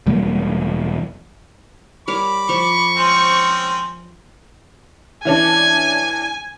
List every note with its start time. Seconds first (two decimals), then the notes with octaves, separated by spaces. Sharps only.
0.07 E1 E3 G3 A#3
2.08 G3 A#4 C#5 B5 D6
2.49 F3 C#6
2.97 G#3 C4 C#4 C5
5.25 E3 C#4 D4 G#5